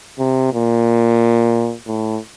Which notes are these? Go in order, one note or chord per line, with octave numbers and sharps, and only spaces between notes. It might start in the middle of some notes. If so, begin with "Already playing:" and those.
C3
A#2
A2